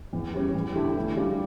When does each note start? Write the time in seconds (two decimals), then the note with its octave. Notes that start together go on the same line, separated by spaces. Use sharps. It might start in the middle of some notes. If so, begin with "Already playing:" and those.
0.13 E2
0.33 E3 G3 C#4
0.55 E2
0.75 D3 A3 E4 G4
0.95 E3
1.16 G3 D4 F4